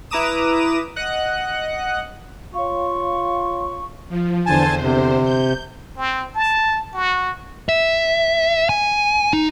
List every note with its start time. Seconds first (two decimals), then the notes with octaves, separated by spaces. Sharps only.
0.11 E4 B4 A#5 D6 D#6 E7
0.96 D#5 F#5 F#6
2.54 F4 C#5 F5 C#6
4.09 F3
4.46 E2 D3 C5 G#5 A5
4.82 C3
5.23 G6
5.97 C4
6.35 A5
6.94 F#4
7.69 E5
8.69 G#5
9.33 D#4